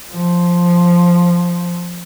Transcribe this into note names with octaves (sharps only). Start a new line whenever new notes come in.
F3